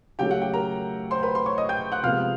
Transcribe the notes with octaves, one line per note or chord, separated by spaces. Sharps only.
C#3 F#3 A3 G4 G5
F#4 F#5
G4 G5
A#4 A#5
C5 C6
B4 B5
C6
C#5 C#6
D#5 D#6
G5 G6
F#5 F#6
C3 F3 G#3 B3 F5 F6